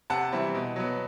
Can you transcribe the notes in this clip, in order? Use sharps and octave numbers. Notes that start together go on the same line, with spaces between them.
C3 F#5 A5
E3 G3 C4 E4
B2
F#3 B3